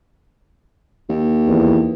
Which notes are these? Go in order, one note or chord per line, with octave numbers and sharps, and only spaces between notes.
D#2
E2